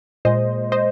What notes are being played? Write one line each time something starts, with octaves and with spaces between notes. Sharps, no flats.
A#2 G#3 C5 D#5
C5 D#5